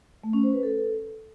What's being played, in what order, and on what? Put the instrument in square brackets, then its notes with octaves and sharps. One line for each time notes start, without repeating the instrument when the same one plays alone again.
[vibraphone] A3
C#4
C5
B4
A4